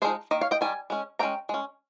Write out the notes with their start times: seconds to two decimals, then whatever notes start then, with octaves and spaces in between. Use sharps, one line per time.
0.02 F3 G#3 D#4 G#4 C5
0.31 D#3 A#3 D#5
0.41 C#5 F5
0.51 D#5 G5
0.61 D#3 G3 G#5
0.90 G#3 C#4
1.19 D#3 G#3 C#4 G5 A#5
1.49 G#3 C#4